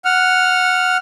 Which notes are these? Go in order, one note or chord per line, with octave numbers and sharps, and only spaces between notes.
F#5 F6